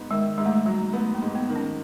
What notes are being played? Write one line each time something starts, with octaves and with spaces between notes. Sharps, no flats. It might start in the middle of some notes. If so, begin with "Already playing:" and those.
Already playing: G#2 B3
D#3 G#3
G#2 G#3
A3
G#3
F#3 G3
A3 B3
A#3
G#2
B3
D#3
C#4